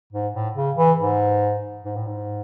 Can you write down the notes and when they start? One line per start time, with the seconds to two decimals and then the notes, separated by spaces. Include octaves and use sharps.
0.13 G#2
0.34 A2
0.56 C#3
0.77 E3
0.98 G#2
1.85 G#2
1.96 A2
2.07 G#2